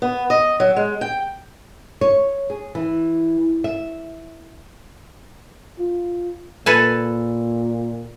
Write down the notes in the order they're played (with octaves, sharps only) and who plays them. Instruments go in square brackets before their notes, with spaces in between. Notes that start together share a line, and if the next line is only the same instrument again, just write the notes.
[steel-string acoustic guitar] B3
D#5
F#3
G#3
G5
[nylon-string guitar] C#5
G#4
E3
E5
[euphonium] F4
[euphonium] A#2 [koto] A4 B4 G#5